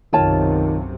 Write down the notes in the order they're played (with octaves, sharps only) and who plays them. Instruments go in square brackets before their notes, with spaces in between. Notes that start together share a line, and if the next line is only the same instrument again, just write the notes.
[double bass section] B1 F#2 C3 [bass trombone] D#3 [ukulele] F4 C#5 A5